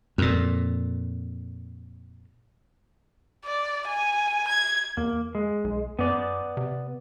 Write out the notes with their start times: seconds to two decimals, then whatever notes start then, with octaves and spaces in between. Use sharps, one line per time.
0.18 F2 A#2
3.45 D5
3.87 G#5
4.48 G#6
4.97 E2 A#3
5.35 G#3
5.64 B1
5.99 F#2 B3 D5
6.57 C3